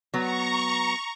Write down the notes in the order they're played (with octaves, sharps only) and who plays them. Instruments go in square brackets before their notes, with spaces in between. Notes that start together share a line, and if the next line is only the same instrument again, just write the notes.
[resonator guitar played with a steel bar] F#3 B3 [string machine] A#5 C#6